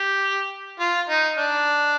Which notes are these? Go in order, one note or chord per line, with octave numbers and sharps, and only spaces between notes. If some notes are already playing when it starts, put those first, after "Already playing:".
Already playing: G4
F4
D#4
D4